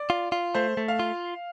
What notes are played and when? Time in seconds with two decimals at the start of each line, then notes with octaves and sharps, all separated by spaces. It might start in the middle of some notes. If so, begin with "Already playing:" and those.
Already playing: D5
0.10 F4
0.32 F4
0.54 A3 C5
0.77 A3
0.88 F5
0.99 F4